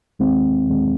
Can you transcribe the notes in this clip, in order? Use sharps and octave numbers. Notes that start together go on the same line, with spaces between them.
D#2 D#3 G#3 C4
D#2 D#3 G#3 C4